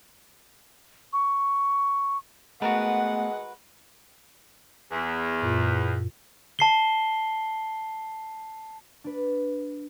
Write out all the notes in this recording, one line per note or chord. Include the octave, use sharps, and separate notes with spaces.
C#6
G#3 A3 B3 F#4 A#4 B4 F#5
E2
F#2 A#2 F4
A5 C7 G7
D4 B4